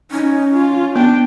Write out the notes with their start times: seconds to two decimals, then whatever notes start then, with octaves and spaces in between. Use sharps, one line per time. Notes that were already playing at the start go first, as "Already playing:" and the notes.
0.11 C#4 D#4
0.54 F4
0.96 B3 D4 G5